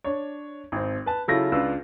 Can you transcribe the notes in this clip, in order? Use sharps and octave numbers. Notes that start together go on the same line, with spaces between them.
D4 C#5
G#1 C4
B4 A5
C#3 F#3 E4 F4 A4 A#6
C#2 D4 F4 B4 E6